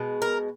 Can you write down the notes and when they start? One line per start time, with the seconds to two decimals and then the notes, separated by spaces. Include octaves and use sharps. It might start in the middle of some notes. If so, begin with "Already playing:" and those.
Already playing: B2 G#3
0.22 A#4